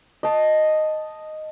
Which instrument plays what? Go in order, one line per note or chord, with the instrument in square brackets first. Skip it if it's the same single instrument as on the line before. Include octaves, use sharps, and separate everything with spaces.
[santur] D#5 A5